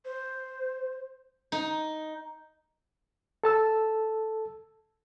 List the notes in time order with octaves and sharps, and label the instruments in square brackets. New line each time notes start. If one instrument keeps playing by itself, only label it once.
[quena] C5
[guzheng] D#4
[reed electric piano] A4 A5 E6